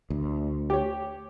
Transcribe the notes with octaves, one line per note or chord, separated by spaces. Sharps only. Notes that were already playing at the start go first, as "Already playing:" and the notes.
D2
G4 C#5